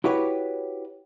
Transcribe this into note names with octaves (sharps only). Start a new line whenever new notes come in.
E4 F#4 G4 B4 C#5